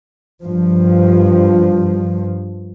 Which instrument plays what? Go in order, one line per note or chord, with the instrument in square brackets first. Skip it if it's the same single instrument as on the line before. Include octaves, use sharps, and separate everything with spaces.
[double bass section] G2 F3